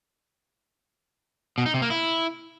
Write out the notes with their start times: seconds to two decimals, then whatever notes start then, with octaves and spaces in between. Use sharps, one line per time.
1.58 B2
1.66 D#4
1.74 C3
1.82 A#3
1.90 E4